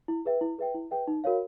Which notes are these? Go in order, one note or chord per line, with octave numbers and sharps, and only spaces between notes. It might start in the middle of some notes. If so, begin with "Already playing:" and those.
E4
G#4 B4 E5 G5
E4
G#4 B4 E5 G5
E4
G#4 B4 E5 G5
D#4
F#4 A#4 C#5 F5